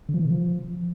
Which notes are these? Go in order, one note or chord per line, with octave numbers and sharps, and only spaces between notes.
D3
F3
E3
C3
F3